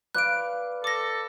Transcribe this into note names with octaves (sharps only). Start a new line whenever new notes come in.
B4 D5 F5 F#6 D7
A4 D6 A#6